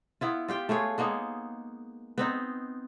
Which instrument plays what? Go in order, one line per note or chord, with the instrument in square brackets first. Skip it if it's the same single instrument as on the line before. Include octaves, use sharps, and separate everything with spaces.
[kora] B3 E4 F4
F4 G4 G5
A3 F4 G#4 C#5
G#3 A#3 B3 D#4
B3 C4 D#4